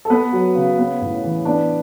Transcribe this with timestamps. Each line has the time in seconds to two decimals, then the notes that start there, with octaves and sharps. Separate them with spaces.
0.05 A4
0.10 B3 B4
0.32 F#3
0.55 C#3
0.78 B3
1.01 A2
1.23 E3
1.45 B3 D4 D5